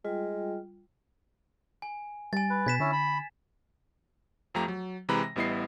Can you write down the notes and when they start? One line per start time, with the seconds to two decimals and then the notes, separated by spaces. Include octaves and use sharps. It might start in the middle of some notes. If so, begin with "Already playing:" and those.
0.05 G3 G#3 F4 G5
1.82 G#5
2.33 G3 G#5 A6
2.50 B4
2.66 B2 G#6 B6 E7
2.80 D3 C#4 E4
2.93 B5
4.54 F2 F3 A3 G4 A#5
4.68 F#3
5.09 C3 E3 G#3 A#5 B5
5.23 A#6
5.36 A1 G3 B3 E4 D#5 C7